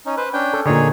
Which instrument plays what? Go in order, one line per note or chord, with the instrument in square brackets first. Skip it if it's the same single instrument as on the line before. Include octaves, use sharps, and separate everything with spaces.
[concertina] C#4 D#4
B4 C5
C#4 D4 G5
[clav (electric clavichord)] A4
[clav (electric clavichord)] A#2 D3 [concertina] D#4 G#4 C#5